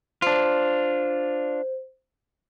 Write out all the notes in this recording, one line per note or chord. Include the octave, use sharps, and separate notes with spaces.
D4 F4 C5